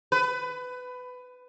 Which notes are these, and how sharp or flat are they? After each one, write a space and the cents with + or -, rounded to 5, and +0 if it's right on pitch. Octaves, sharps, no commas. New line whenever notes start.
B4 +20